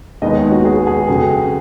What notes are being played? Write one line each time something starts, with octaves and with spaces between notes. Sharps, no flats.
D#2 D#3 G#3 B3 D#5
C#5
F#4
G#4
G#4
F2 C#3 F#3